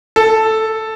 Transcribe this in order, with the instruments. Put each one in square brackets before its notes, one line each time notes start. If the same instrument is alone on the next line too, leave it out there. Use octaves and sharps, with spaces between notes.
[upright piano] A4